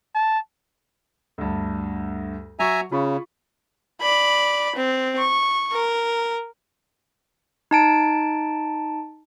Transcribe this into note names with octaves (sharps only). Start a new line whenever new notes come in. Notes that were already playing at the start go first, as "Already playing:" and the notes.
A5
D2 G2
F#3 E5 G#5 A#5 C#6
C#3 F4 B5 C#6
D5 B5
C4
C#6
A#4
D#4 A5 D7